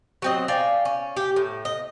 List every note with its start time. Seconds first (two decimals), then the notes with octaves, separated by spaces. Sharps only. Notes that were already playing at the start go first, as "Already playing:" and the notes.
0.22 F#3 C4 D#5
0.48 D5 F5 G5 G#5
0.85 C#4
1.16 G4
1.36 A2
1.65 D#5